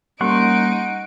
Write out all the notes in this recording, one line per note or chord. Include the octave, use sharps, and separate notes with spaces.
G3 A#3 C#4 D#4 F#5 C6 C#6 D7